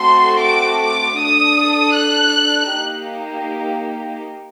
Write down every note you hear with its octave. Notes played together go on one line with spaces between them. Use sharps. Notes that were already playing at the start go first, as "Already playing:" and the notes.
Already playing: A3 C4 F#4 A4 C6
D6
D6
D4 A4 D#6
F#6
A#3 D#4 G4